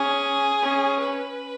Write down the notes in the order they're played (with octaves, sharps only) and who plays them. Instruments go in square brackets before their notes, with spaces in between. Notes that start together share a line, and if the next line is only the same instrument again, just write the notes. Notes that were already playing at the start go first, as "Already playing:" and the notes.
Already playing: [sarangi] C#4 [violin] G#4
[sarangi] C#4
[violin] B4